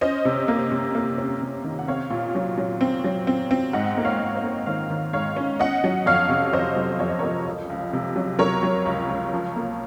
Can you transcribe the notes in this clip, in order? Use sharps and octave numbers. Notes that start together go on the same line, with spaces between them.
C#4 C5 D#5
C3
A#3
C3
A#3
C#4
C3
D#3
F#5
C4 C#5 F5
A#2
F#3
F#3
C4
F#3
C4
C4
G#2 D#5 F#5
A#3
C#5 F5
G#2
C5 D#5
A#3
D#3 C#5 F5
D#3
G#2 C#5 F5
C#4
C#4 D#5 F#5
F#3
F2 C#5 F5
C3
F2 C5 D#5
F#3
F2 C#5
D#5
F2 A#4 C#5
C#2
C#2
C3
F#3
F#3 A#4 C#5
F#3
C#2
C#2
F3
A#3